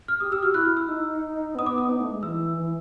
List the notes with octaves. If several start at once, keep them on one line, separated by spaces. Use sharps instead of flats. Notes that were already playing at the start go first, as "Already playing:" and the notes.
F6
G4 D#6
G4 E6
F#4 F6
E4 F#6
F6
E6
D#4
B3 D#6
D6
D#6
D#4
A3
G#3
E3 E6
E3